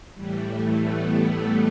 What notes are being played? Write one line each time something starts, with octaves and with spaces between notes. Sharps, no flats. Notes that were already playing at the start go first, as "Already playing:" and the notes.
A2 E3 G3
A3
B3